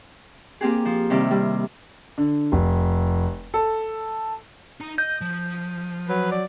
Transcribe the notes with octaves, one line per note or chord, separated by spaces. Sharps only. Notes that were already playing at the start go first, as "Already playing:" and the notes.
A#3 C4 G4 G#4
F3
C3 D#3 G3 E4
G3
D3
F1
A4
D#4 A#5
D#5 G6
F3
F#3 B4
D5